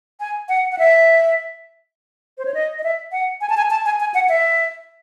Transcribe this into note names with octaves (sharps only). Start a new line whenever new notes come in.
G#5
F#5
F#5
E5
C5
C#5
D#5
D#5
E5
F#5
G#5
A5
G#5
A5
G#5
G#5
F#5
E5